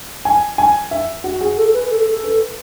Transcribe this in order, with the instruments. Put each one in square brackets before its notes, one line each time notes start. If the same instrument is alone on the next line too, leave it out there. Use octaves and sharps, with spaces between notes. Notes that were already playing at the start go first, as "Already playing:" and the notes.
[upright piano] G#5
G#5
E5
F#4
G#4
[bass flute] A4
B4
A4
A4
[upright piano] B4